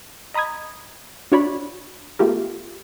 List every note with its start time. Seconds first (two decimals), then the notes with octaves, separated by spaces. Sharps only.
0.34 D#5 A#5 B5 D#6 G#6
1.32 D4 F#4 C#5 D5 B5
2.19 A3 B3 F4 G4 G#4 A#4